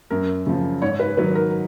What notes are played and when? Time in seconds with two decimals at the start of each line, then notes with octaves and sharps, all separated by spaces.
0.10 F#2 A#4
0.46 C#3 F3
0.82 G#2 C#5
1.00 B4
1.17 D#3 F#3 B4
1.35 A#4